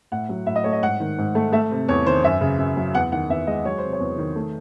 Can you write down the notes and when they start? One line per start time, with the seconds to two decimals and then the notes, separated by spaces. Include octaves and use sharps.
0.12 A2 F#5
0.29 F#3
0.46 A2 E5
0.56 D#5
0.64 A3 C#5
0.72 D#5
0.82 G#2 F#5
1.00 D#3
1.18 G#2
1.35 A3
1.52 A3 E5
1.71 C3
1.88 E2 C#5
2.06 D#3 C5
2.24 F#2 E5
2.41 C#3
2.58 F#2
2.77 F#3
2.94 E2 F#5
3.12 D#3 F#5
3.29 E2 E5
3.47 G#3 D#5
3.64 F#3 C#5
3.78 C5
3.83 C3
3.93 C#5
4.00 E2
4.18 D#3
4.36 A3